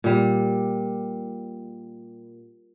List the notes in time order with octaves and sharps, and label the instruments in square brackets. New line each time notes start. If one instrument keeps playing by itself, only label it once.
[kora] A#2 G3